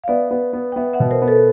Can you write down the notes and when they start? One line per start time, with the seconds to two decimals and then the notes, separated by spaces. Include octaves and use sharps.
0.04 F5
0.08 B3 D5 E5
0.31 B3
0.53 B3
0.72 G5
0.76 B3 E5 F#5
0.93 E5 F#5
1.00 B2
1.11 A#4 C5
1.22 B3
1.28 A4 B4